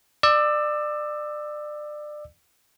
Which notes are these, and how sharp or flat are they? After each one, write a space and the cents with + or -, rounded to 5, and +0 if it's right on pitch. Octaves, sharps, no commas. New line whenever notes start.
D5 +25 E6 +0